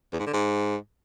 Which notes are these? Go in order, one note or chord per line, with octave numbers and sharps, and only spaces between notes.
E2
G#2
D3
G#2